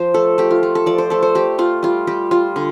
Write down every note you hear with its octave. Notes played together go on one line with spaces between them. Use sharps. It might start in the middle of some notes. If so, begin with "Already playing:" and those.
Already playing: F3 C5
A3 A4
A3 G4
F4
A3
A4
F3 D5
C5
A3 A4
C5
A3 G4
A3 F4
G3 F4
G3 G4
G3 F4
D3